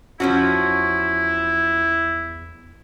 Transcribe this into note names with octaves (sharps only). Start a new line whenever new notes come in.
E2 F3 C#4 E4 F#4